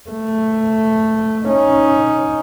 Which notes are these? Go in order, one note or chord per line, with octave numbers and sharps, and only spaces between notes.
A3
C#4 D#4